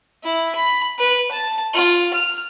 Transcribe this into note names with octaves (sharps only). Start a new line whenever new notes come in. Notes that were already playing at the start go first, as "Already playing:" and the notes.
E4
B5
B4
A5
F4
F6